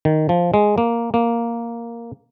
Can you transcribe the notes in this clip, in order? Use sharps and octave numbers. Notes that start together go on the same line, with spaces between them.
D#3
F3
G#3
A#3
A#3